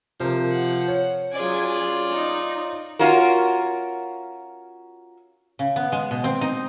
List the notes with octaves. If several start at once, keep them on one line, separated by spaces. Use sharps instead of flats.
C3 F3 A#4
F#5
C#5
F#3 C#4 F4 G#4 D5 G#5
D#4
C#4 F4 F#4 A#4
C#3
B3
G#3
B2
C4
D#4